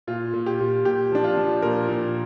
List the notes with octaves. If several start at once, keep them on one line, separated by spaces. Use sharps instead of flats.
A#2 F4
A#2
G4
A#2
A#2 G4
F3 D4
F4
F3
A#2 A#4
A#2